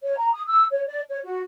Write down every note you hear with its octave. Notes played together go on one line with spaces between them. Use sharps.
C#5
A#5
D#6
E6
C#5
D5
C#5
F#4